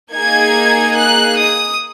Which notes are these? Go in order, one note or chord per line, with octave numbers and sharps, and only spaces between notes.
A#3 D#4 G#4 G#6
F#6
D#6